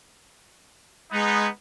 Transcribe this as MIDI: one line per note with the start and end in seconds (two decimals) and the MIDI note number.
1.12 1.47 56
1.12 1.48 59
1.12 1.48 63